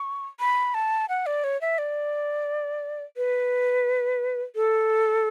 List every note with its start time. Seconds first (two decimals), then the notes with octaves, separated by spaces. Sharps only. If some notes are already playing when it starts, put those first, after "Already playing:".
Already playing: C#6
0.40 B5
0.74 A5
1.09 F#5
1.26 D5
1.44 C#5
1.61 E5
1.78 D5
3.17 B4
4.56 A4